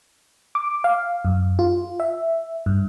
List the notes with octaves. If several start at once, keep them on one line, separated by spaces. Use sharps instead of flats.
D6
F5
F#2
F4
E5
G2